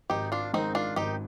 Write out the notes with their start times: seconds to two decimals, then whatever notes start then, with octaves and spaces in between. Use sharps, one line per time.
0.10 G#1 D#4 G4
0.32 D4 F4
0.54 G#2 D#3 C4 D#4
0.75 D4 F4
0.96 G#1 D#4 G4